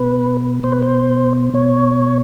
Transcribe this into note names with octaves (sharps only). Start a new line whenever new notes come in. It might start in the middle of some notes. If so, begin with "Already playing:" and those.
Already playing: B2 B4
B2 C5
B4
C5
B2 C#5